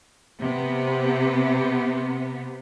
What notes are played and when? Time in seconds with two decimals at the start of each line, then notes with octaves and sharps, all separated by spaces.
0.40 C3 B3